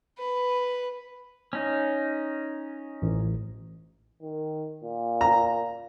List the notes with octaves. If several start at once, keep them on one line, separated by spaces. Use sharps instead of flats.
B4
C#4 D#4
A1
D#3
A#2
A#5